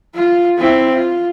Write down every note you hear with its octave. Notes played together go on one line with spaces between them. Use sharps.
F4
C4 E4
F4